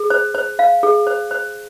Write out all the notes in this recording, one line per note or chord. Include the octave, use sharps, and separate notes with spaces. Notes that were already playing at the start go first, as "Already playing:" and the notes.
Already playing: G#4
C5
C5
F5
G#4
C5
C5